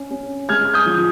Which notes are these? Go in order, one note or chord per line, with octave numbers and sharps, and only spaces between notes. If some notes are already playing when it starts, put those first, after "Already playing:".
Already playing: C#4
C#4
G#3 F6 G#6
F6
D#6 G6
F3